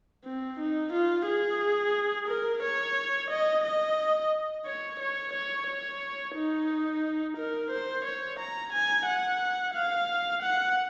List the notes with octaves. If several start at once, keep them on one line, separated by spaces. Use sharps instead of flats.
C4
D#4
F4
G#4
A#4
C#5
D#5
D#5
C#5
C#5
C#5
C#5
D#4
A#4
C5
C#5
A#5
G#5
F#5
F5
F#5